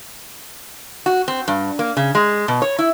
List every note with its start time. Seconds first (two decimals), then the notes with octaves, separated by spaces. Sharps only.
1.06 F#4
1.28 C4
1.48 G2
1.79 A#3
1.97 C#3
2.15 G#3
2.48 B2
2.62 C#5
2.79 E4